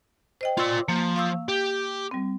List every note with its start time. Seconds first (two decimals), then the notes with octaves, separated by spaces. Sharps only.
0.41 C5 D#5 G5
0.57 F4 D5 C6 C#6 E6
0.88 F3 A#3
1.16 F5 C#6 E6
1.49 G4
2.11 G3 C4